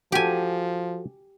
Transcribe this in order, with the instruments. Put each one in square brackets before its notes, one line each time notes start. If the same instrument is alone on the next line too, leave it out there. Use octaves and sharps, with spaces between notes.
[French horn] F3 [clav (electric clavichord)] F#4 A4 [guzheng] G4 G#5